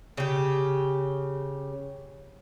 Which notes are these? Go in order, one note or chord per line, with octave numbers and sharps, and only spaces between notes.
C#3 G4